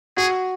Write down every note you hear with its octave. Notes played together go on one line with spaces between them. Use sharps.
F#4 G#4